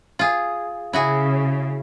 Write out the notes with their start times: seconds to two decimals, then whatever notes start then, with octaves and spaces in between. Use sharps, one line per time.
0.19 F4 G#4
0.93 C#3 E4 F#4 G#4